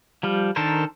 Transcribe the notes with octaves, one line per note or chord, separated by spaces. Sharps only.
F3 G3
D#3 D4 A4 A#4 C5